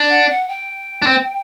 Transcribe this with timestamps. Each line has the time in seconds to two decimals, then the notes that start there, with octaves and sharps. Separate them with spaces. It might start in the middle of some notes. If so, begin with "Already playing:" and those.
Already playing: D4
0.10 F#5
0.30 F#5
0.49 G5
1.02 D4
1.07 C4